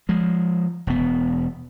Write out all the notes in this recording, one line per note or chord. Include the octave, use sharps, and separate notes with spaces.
F3 G#3
E1 B3